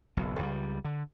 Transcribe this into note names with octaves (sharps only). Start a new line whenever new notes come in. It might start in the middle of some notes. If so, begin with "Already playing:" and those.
F#1 B1 E2
C#2 F#3 G3
D3